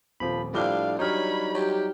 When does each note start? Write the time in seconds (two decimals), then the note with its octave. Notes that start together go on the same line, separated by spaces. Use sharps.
0.20 D#1 F3 C4 A4 B5
0.54 A2 F3 G3 D4 F5 D6 G7
0.99 F#3 G3 D4 D#4 C#5 B5 F6
1.54 F#3 G4